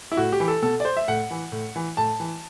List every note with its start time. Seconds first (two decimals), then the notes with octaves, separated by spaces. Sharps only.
0.12 E4
0.17 A2 F#4
0.32 G4
0.40 E3
0.48 A4
0.62 B2 A4
0.80 D5
0.85 C5
0.97 E5
1.08 A2 F#5
1.31 E3
1.52 A2
1.76 E3
1.97 A2 A5
2.20 E3